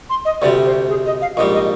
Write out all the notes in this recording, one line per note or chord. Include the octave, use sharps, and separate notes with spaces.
C6
D#5
D2 C3 G3 D5
C5
G#4
D#5
F5
A#1 G#2 G3 D#5
D#5